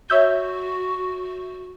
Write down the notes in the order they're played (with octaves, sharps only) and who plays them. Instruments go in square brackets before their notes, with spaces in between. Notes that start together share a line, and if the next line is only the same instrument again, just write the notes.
[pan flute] F#4 [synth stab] C#5 E5 G6